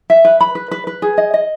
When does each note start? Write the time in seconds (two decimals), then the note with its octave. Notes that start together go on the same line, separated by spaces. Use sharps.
0.10 E5
0.25 B4
0.41 B5
0.55 B4
0.71 B4
0.87 B4
1.02 G#4
1.18 D#5
1.34 D#5